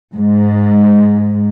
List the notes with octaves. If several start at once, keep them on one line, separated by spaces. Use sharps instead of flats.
G#2